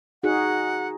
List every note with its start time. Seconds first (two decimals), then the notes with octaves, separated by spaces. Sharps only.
0.23 D#4 F#4 G#4 F#5